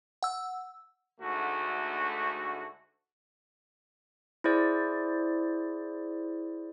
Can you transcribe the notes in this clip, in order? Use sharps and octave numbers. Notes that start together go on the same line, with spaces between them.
F#5 E6
D2 G#2 D3 A3 F#4
E4 G#4 C5 D5